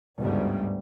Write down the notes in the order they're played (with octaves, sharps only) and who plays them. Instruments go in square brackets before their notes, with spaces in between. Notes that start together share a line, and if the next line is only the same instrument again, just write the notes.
[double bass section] G1 D2 G#2 C#3 G3